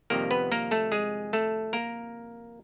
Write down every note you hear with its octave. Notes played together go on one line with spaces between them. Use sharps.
F2 C3 D#3 G3 A#3 A#4
B3 B4
A#3 A#4
A3 A4
G#3 G#4
A3 A4
A#3 A#4